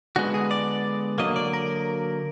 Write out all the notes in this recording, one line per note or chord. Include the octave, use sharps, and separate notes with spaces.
D3 G#3 B3 F#4
G#4
D5
D3 F#3 A#3 D#5
D5
A#4